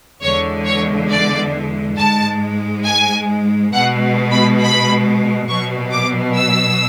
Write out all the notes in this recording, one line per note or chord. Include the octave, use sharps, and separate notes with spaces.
E2 D3 G#3 C#5
C#5
D5
G#2 G#3 A5
G#5
B2 G#3 F#5
B5
B5
B2 F#3 C#6
D6
E6